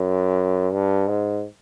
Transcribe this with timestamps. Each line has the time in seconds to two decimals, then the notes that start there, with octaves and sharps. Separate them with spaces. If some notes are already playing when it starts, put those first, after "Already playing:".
Already playing: F#2
0.73 G2
1.08 G#2